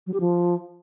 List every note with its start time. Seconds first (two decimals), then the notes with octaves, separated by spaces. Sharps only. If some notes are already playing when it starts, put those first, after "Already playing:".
0.06 F#3
0.13 G4
0.20 F3